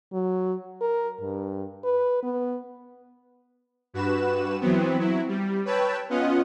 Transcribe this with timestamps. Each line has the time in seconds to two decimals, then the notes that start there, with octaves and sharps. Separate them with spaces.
0.13 F#3
0.81 A#4
1.21 G2
1.84 B4
2.23 B3
3.94 G2 F#4 B4 E7
4.61 E3 F#3 B3 C4
4.99 F#3 E4
5.28 G3
5.65 B4 C#5 G5 A5 B5 E6
6.10 B3 C#4 F4 D#5 F#5